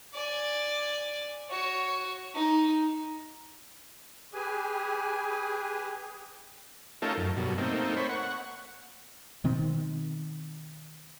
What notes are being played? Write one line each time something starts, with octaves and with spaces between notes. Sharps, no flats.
D5 G#5
F#4 C#5
D#4
G4 G#4 B4 G#5
A3 C#4 D#4 F4 A4 A#4
F#2
G2 B2 F#3
A3 A#3 C4 D#4
C5 C#5 B5
F#5 C#6
B2 D#3 C4